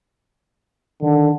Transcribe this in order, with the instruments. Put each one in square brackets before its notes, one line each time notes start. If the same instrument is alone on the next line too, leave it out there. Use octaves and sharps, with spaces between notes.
[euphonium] D3 [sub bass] D#3